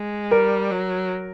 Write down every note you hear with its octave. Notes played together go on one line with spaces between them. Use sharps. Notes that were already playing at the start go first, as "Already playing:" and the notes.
Already playing: G#3
G3 A#4
F#3